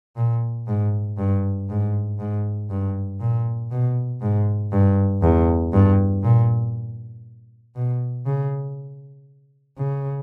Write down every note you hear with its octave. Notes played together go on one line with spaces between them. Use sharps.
A#2
G#2
G2
G#2
G#2
G2
A#2
B2
G#2
G2
E2
G2
A#2
B2
C#3
C#3